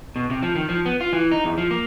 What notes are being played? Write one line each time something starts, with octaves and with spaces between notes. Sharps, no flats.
B2
C3
F3
D#3
F3
B3
F4
E3
D#4
E2
F3
A#3